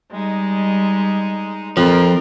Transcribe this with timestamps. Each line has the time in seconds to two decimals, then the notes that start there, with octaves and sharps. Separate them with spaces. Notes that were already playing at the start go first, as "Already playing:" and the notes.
0.10 G3 G#3 D#4
1.77 F2 F3 C4 A#4